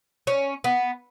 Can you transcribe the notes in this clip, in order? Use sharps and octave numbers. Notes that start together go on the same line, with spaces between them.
C#4
B3